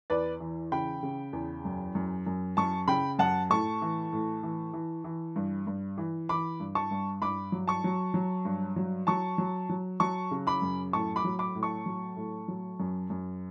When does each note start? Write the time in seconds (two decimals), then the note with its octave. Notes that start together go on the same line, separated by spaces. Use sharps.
0.10 E2 B4 D5
0.40 E3
0.72 C#3 G5 B5
1.03 C#3
1.33 E2
1.65 F#2
1.95 F#2
2.27 F#2
2.57 F#2 A5 C#6
2.88 C#3 G5 B5
3.19 F#2 F#5 A5
3.50 A2 A5 C#6
3.82 E3
4.13 A2
4.43 E3
4.73 E3
5.04 E3
5.36 G2
5.67 G2
5.98 E3
6.29 E3 B5 D6
6.60 G2
6.75 A5 C#6
6.91 G2
7.22 G2 B5 D6
7.52 F#3
7.68 A5 C#6
7.84 F#3
8.14 F#3
8.45 G2
8.76 F#3
9.07 F#3 A5 C#6
9.38 F#3
9.69 F#3
10.00 F#3 A5 C#6
10.31 C#3
10.47 B5 D6
10.62 F#2
10.93 A2 A5 C#6
11.16 B5 D6
11.25 F#3
11.39 B5 D6
11.55 A2
11.63 A5 C#6
11.86 F#3
12.16 A2
12.48 F#3
12.80 F#2
13.10 F#2